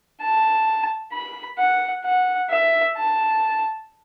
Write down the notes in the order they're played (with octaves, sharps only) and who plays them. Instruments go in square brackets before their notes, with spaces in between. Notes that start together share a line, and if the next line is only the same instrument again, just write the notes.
[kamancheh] A5
B5
F#5
F#5
E5
A5